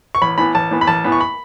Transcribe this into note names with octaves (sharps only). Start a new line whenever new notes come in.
C#6
A1 B5
A2 E3 B3 B5
A1 A5
A2 E3 B3
B5
A1 A5
A2 E3 B3
C#6
B5